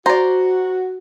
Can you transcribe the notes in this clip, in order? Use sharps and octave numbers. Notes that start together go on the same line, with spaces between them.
F#4 C5 D5 A#5